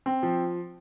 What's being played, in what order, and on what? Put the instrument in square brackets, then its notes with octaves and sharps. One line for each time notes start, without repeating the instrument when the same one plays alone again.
[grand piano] C4
F3